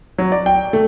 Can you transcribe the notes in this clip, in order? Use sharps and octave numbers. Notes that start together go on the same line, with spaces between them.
F#3
D5
G5
A3